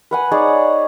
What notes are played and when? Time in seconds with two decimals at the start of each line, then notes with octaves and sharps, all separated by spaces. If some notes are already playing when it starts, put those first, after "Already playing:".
0.11 B4 F#5 G#5
0.31 D#4 G#4 C#5 D5